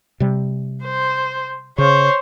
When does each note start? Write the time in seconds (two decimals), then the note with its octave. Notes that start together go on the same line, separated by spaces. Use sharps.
0.20 C3 G3
0.84 C5
1.78 C#3 C5 C#5